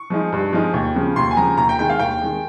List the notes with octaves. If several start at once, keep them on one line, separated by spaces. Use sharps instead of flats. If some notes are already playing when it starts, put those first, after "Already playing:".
Already playing: C#6
F3 G#3 D#4
G2
F3 G#3 D#4
D#2
C#3 F3
D#2 C6
G#5
C#3 F3 A#5
D#2 A#5
G5
D#3 G#3 G5
F5
D#2 G5
D#3 G#3